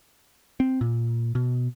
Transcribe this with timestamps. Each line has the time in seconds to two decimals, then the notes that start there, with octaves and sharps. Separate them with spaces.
0.60 C4
0.81 A#2
1.35 B2